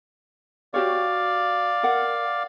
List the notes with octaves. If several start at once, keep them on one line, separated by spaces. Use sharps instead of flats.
F#4 G4 C#5 D5 F5
A#4 F#5